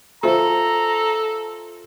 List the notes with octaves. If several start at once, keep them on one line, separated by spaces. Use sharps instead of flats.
F4 A4 C5 E5 A#5